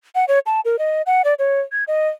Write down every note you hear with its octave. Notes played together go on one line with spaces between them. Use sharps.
F#5
C#5
A5
A#4
D#5
F#5
D5
C#5
G#6
D#5